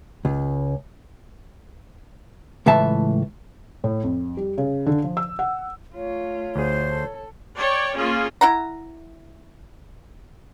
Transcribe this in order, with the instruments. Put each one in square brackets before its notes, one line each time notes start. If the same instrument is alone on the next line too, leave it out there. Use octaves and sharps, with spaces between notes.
[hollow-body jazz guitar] C#2
C#2 A2 E3 E5 A5
[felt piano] A2
F2
G3
C#3
D3
F3
E6
F#5
[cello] A3 F4 [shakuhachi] C#5
[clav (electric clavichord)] D2 G#4 [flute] C5
[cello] A4
[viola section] C#5 D5 G5
A#3 C#4 F4 G#4
[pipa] E4 F#5 A#5